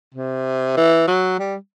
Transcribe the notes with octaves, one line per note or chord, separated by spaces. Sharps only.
C3
E3
F#3
G3